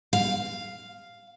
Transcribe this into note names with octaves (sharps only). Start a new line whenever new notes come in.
F5